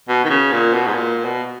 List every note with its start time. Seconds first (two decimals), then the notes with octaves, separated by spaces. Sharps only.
0.08 B2
0.25 D#3
0.30 C#3
0.52 A#2
0.73 B2
0.88 G#2
0.95 A#2
1.25 B2